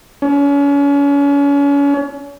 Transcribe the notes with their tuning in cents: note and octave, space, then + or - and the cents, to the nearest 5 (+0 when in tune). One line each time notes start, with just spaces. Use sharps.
C#4 +35